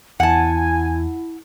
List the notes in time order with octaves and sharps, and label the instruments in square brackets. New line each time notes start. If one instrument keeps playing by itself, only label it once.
[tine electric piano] E2 [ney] E4 [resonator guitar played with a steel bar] F#5 A5 [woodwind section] G#5